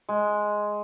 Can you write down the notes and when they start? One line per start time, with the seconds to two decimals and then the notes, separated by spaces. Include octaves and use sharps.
0.09 G#3